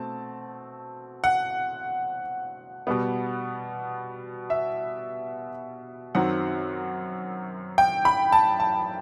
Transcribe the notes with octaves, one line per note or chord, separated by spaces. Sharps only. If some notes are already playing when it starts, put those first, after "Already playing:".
Already playing: B2 A3 C4 A5
F#5
B2 G3 B3
E5
F#2 D#3 F#3 C4 F#5
G5
B5
A5
A5